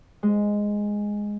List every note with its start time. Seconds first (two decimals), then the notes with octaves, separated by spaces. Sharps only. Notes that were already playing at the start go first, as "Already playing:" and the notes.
0.23 G#3